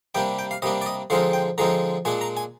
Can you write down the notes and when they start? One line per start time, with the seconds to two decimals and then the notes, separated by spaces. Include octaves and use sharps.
0.15 C3 G3 A#3 D4 G5
0.39 G5
0.51 F5
0.62 C3 G3 A#3 D4 D#5
0.81 D5
0.86 D#5
1.10 D3 F3 G#3 C4 D#4 F5
1.33 G5
1.58 D3 F3 G#3 C4 D#4 A#5
2.05 A#2 G#3 D4 G#5
2.21 A#5
2.37 G#5